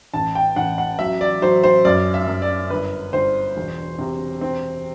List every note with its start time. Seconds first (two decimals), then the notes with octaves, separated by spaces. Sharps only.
0.13 A1 A5
0.35 G5
0.56 A1 F#5
0.78 F#5
0.99 F#3 E5
1.21 D5
1.42 F#3 C5
1.64 C5
1.85 F#2 D5
2.14 E5
2.28 F#2
2.42 D5
2.70 G1 B4
3.13 G1 C5
3.56 E1
3.99 C3
4.41 C4